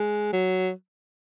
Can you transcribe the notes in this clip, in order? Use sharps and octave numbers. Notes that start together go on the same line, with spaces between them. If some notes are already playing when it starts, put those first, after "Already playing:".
Already playing: G#3
F#3